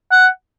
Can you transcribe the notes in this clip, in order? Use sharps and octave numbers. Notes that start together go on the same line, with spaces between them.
F#5